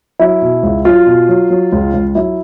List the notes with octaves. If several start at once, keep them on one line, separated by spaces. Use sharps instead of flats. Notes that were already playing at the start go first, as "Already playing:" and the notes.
F#3 E4
B2
C#2
F#3 F4
B2
F#3
F#3
C#2
C#2
F#3 E4